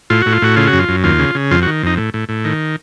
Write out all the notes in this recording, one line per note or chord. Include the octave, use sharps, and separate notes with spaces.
A2 F4
A2 F#4
F4
A2 F#4
C#3 F4
F#4
F#2
F4
F#2
D#2 F4
C#3
C#3
F2 F4
F#4
D#3
F2 D#4
A2
A2
A2
D#3